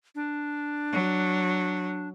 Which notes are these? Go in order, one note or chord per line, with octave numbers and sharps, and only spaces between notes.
D4
F#3